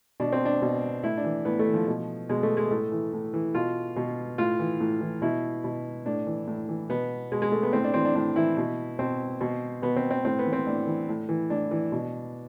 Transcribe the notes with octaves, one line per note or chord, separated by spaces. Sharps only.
B2 D4
C4
D4
B2
A2 E4
D4
E3
A2 B3
A3
E3
F3
B2
B2 G#3
A3
G#3
A2 A3
E3
A2
E3
B2 F4
B2
A2 F4
E3
A2
E3
B2 E4
B2
A2 D4
E3
A2
E3
B2 B3
B2 G#3
G#3
A3
B3
A2 C4
D4
E3 C4
D4
A2 D4
E3 E4
B2
B2 C4
B2
B2 B3
C4
C4
A2 C4
B3
E3
C4
A2 D4
E3
A2
E3
A2 D4
E3
B2